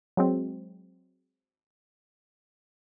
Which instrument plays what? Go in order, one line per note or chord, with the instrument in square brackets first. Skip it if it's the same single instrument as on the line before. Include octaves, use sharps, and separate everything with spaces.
[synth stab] F#3 G#3 C4